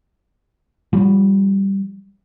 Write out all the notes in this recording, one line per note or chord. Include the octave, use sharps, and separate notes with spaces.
F3 G3